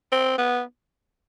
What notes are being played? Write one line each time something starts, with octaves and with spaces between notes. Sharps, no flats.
C4
B3